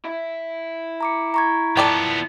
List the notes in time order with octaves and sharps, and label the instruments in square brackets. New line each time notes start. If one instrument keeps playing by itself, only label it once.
[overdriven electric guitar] E4 E5
[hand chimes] A#5 D6 C#7
A#5 C#6 G#6
[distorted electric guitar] F3 B3 [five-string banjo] A4 D5 G5